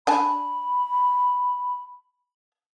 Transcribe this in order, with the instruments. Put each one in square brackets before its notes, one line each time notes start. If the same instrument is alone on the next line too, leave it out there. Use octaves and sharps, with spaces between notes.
[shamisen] D4 G#5 A5 [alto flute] B5